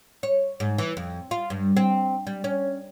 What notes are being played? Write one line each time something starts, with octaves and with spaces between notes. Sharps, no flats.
C#5
G#2
E3
F2
F4
G2
C4
G3
C#4